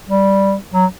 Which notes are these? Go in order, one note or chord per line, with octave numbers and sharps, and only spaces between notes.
G3
F#3